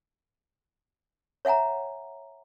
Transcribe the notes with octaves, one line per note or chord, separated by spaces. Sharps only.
C#5 E5 F#5 G#5 A#5